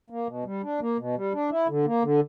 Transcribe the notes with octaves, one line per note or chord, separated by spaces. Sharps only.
A#3
B2
G3
D4
A#3
B2
G3
D4
E4
D3
A#3
D3